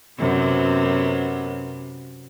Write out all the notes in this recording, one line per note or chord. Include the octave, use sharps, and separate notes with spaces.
F#2 C3 B3